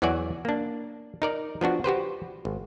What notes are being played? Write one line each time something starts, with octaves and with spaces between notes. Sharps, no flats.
E2 E3 F#3 F#4 D5 G#5
A#3 D4
D#4 A#4 D5
F3 B3 D4 F#4
F#4 G4 B4 C5
G#1